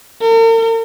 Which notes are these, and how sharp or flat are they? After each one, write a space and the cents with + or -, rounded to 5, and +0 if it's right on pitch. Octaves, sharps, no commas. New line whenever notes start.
A#4 -45